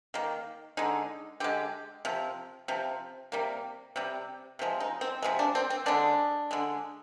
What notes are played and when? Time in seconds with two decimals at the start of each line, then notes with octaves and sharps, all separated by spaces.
0.14 D#3 A#3
0.77 D3 G#3 D#4
1.40 D3 G#3 G4
2.05 C3 F3
2.68 C3 F3
3.32 C3 G3 A#3
3.96 C3 G3
4.59 C3 F3 G#3
4.80 D#4
5.01 C4
5.22 C3 F3 G#3
5.39 D4
5.55 C4
5.70 C4
5.86 D3 G#3 D4
6.51 D3 G#3